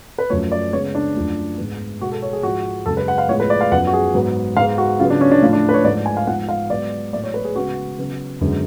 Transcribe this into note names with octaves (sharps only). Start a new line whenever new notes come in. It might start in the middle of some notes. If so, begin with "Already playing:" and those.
B4
F#2 F3 A3 C#5
D5
C#3 G#3 B3 C#5
D4
F#2 F3 A3
G#2 G#3 B3
B2 G#3 B3 F#4
A4
C#5
G#4
G#2 F3 G#3 F#4
F#2 C#3 G#3 A4
B4
F#5
F5
A2 F3 G#3 B3 C#5
B4
D5
F5
F#2 F3 B3 F#5
F#4
G#4
G#2 F#3 B3
G#2 G#3 B3 F5
F#4
C#3 F#3 B3 F4
D4
C#4
D4
A2 F3 A3 F4
D4
B4
C#5
G#2 F3 A3 D5
G#5
F5
G#2 F3 B3 F#5
F5
G#2 F#3 B3 D5
A2 F#3 B3 D5
C#5
B4
G#4
C#3 G#3 B3 F#4
C#3 F#3 B3
F#2 D3 G#3 B3